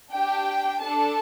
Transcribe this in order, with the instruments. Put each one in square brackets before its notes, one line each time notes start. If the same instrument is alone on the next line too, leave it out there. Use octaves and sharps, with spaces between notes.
[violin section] D4 G4 G5
D4 A4 A5